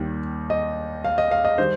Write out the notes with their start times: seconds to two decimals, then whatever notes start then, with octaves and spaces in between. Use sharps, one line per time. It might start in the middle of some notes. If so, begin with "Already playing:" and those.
Already playing: D#2 D#3 G3
0.50 D#5
1.04 F5
1.18 D#5
1.31 F5
1.45 D#5
1.58 D#3 G3 C5